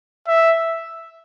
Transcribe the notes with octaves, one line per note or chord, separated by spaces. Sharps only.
E5